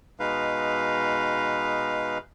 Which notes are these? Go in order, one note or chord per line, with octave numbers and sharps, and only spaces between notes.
B2 G#3 D#4 B4 F5